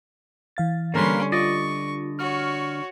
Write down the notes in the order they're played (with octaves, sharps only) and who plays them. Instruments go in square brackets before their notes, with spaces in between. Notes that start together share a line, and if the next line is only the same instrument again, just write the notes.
[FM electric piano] E3 F5 A6
[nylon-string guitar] D3 G3 [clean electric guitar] A#3 A#4 B4 [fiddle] C#4 C6
[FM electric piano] F4 [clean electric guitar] D5 D#5 [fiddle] C#6
[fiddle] F#4 C#5 [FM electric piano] F6